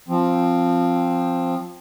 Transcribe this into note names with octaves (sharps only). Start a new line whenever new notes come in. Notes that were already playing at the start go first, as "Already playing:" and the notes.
F3 C4